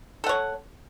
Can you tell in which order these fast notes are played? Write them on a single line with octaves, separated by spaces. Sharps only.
A4 F#5 C#5